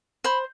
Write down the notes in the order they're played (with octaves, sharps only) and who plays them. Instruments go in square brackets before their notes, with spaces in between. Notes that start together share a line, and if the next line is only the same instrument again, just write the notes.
[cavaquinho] C5 B5